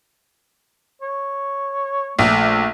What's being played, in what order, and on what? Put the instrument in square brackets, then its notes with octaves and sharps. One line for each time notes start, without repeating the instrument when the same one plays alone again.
[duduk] C#5
[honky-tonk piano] A#1 [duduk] A3